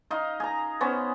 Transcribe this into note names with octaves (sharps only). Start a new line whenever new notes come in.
D#4 D#5 F5
G#4 A#5
B3 C#4 G#4 C5